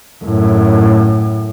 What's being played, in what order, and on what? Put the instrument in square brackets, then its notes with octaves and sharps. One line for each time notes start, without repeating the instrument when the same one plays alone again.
[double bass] F#2 A2